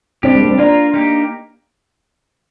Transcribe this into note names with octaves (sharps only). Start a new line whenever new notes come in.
G3 C4 D4 G4
G#3
A#3
C4
A#3 D4 F4 A#4
A#3 D#4 G4